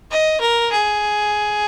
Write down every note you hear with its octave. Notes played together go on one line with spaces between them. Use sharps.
D#5
A#4
G#4